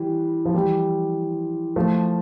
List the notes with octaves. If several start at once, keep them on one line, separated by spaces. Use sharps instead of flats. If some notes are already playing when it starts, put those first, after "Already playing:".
Already playing: E3 G3
F3
E3 G3
F3 A3